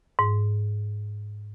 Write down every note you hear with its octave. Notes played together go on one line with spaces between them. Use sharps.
G#2